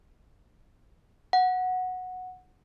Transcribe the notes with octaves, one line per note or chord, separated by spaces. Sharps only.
F#5